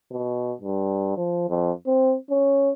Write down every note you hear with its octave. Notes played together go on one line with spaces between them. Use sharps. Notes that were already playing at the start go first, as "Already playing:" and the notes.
B2
G2
F3
F2
C4
C#4